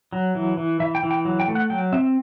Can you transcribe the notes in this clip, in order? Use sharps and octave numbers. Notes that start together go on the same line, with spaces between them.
F#3
E3
E3
E3 E5
G5
E3
G5
F#3
G5
A3
F#5
F#3 G5
C4 E5